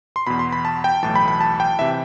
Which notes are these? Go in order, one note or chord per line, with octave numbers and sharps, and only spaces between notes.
C6
E2 B2 B5
C6
B5
A5
G5
B1 A2 E3 A5
B5
B5
A5
G5
C3 E3 E5